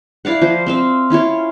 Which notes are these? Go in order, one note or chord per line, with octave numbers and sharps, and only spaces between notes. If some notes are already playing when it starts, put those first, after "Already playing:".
E4 D5 F5 F#5
F3 C5
C4 E5 F5
C#4 E4 F4 C#5